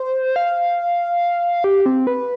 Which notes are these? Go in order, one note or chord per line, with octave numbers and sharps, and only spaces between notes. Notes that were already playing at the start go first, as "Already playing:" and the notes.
Already playing: C5
F5
G4
C4
B4